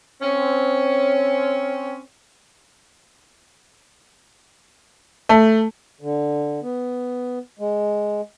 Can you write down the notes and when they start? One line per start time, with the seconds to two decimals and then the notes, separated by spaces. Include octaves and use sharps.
0.22 C4 C#4
5.29 A3
6.01 D3
6.62 B3
7.59 G#3